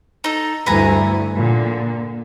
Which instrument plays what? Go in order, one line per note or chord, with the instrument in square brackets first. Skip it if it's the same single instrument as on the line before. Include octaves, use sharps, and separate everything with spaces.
[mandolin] D#4 A4
[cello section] D2 G2 E4 [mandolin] B4 G#5 A#5
[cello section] A#2 D3